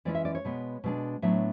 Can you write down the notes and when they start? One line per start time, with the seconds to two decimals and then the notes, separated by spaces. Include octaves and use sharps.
0.05 E3 G#3 C#4 E4 D5
0.15 E5
0.25 D5
0.35 C#5
0.45 B2 G#3 B3
0.84 B2 G#3 D4
1.22 A2 F#3 B3 D4 E5